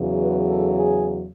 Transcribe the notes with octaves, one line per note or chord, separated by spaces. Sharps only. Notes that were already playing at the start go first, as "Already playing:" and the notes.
Already playing: E2 C#3 F#3
B4
A4
G#4